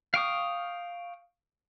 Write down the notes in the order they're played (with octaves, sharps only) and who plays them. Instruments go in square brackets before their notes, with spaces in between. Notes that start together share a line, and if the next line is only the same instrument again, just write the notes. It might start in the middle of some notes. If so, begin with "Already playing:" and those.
[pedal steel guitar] F5 G5 C#6 D#6